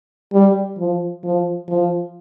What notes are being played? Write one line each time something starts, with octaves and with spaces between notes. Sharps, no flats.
G3
F3
F3
F3